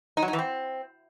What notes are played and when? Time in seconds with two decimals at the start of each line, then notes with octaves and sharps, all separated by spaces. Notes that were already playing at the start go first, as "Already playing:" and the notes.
0.17 D#4
0.22 F#3
0.28 D#4
0.33 E3
0.39 C4